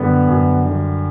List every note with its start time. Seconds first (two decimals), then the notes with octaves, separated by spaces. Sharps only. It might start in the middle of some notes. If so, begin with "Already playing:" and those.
Already playing: F#2 D3 G3 B3
0.29 F#2
0.66 D3 G3